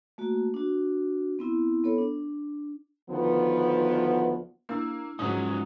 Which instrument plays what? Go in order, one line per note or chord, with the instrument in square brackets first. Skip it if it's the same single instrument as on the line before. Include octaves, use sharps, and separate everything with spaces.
[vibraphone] A3 A#3 F#4
D4 F#4
B3 C4 E4
B3 A4 C#5
D4
[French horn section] D2 D#3 F3 B3
[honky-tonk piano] A#3 [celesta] D4 E4 E6
[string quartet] G#2 F#3 [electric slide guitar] G#3 C#4 D#4 [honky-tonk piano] D#6